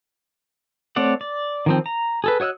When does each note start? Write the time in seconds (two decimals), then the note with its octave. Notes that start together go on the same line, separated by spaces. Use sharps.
0.96 A3 C4 C#5 D5 F#5
1.21 D5
1.66 D#3 F3 C4
1.86 A#5
2.24 G#4 A4 B4
2.40 F#4 C#5 D#5 E6 F#6